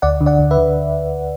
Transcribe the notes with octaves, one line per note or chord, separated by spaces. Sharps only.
D2 D5 F#5
D3
D5 F#5
D2
B4 E5
D3